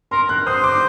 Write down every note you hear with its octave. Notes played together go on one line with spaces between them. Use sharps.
A#4 C6
F#6
C5 D#6
D6